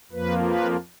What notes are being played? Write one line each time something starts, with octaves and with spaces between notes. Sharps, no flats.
F2 F3 A#3 B4
B4